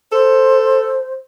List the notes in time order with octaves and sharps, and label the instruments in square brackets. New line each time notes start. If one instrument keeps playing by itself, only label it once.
[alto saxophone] A4 [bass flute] C5